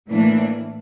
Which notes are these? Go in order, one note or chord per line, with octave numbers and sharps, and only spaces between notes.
A2 E3 A#3 D4